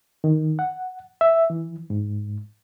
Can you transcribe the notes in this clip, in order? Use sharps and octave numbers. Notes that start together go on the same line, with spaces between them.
D#3
F#5
E5
E3
G#2